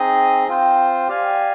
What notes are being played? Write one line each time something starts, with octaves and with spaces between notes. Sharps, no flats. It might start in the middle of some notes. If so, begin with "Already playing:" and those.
Already playing: C4 D#4 G#4 D#5
C4 F4 C5 G5
G4 D5 F5 G#5